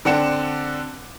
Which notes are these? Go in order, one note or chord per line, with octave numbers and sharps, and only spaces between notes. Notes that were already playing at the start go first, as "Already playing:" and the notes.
D3 C4 D4 F#5 C#7 E7